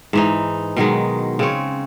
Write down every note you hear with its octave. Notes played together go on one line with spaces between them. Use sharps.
G#2 E3 D#4
B2 D#3 F#3 G#3
C#3 C4 C#5